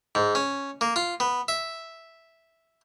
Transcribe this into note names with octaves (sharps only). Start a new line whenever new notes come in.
G#2
C#4
A#3
F4
B3
E5